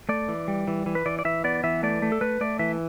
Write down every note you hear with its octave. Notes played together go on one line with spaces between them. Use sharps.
A3 D5
E3
G3
E3
E3
B4
E3 D5
D5
E3 E5
B3 D5
E3 E5
A3 D5
A3
A4
A3 B4
A3 D5
E3 E5